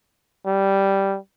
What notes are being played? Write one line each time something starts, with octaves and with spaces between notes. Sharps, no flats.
G3